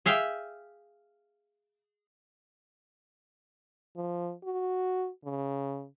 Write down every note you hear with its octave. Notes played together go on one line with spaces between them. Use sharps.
G#4 E5 F5 G5
F3
F#4
C#3